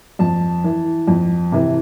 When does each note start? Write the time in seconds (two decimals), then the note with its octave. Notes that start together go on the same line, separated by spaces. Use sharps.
0.19 F2 A5
0.64 E3
1.08 F2
1.52 C3 E3